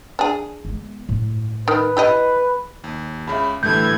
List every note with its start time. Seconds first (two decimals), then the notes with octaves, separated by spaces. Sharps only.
0.19 D4 G#4
0.65 G#3 B3
1.09 A2
1.68 D#3 B4
1.97 E4 G4 D#5
2.84 D#2
3.27 C#2 C#3 E5 B5
3.63 A2 D3 E3 G3 A3 G6 G#6